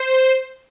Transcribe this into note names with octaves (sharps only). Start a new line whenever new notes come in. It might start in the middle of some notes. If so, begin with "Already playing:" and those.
Already playing: C5